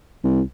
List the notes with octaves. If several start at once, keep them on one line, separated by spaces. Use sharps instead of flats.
C2